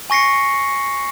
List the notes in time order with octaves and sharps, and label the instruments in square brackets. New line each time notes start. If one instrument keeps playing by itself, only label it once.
[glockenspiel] G#5 C#6 A#6 C7 C#7